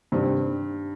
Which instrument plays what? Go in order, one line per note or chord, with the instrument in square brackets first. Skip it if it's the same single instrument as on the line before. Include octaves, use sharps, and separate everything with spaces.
[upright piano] G2 [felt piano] C3 D#3 G3 C4 G4